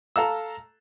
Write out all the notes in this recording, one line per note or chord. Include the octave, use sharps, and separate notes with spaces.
A4 F5 A#5 E6